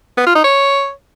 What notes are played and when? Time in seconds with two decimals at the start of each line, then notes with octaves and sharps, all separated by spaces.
0.18 B3
0.27 F4
0.35 D#4
0.44 C#5